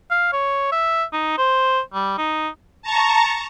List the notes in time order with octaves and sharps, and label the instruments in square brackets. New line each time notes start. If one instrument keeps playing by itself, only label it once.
[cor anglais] F5
C#5
E5
D#4
C5
G3
D#4
[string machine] A5 A#5 C#6